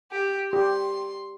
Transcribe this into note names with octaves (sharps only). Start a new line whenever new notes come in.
G4
G4 C6